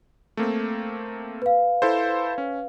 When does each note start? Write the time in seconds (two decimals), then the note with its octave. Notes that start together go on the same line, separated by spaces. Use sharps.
0.37 A3 A#3 C4
1.42 B4 F5
1.82 E4 A4 C5
2.38 C#4